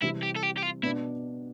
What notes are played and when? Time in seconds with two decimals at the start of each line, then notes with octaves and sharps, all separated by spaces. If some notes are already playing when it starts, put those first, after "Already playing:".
0.02 C3 E3 G3 C4 E4
0.23 G4
0.36 A4
0.43 G4
0.57 G4
0.62 F4
0.83 B2 B3 D4 E4